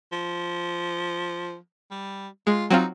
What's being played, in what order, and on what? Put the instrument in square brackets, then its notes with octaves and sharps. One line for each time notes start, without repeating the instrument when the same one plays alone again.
[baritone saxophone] F3
G3
[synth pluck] G#3 [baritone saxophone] F4
[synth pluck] F#3 C4 F4 [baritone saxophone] D#4